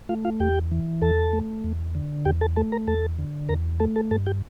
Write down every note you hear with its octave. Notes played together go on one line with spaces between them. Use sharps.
A3 F4 F5
F4 F5
E2 G4 G5
E3
E2 A4 A5
A3
E2
D3
E2 G4 G5
A4 A5
A3 A4 A5
A#4 A#5
E2 A4 A5
D3
E2 A#4 A#5
A3 A4 A5
A4 A5
G2 A4 A5
G4 G5